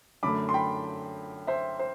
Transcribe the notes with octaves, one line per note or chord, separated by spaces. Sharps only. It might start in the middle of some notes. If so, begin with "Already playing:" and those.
F#2 D3 A3 B5 D6
C6
G5 B5
C5 E5
C5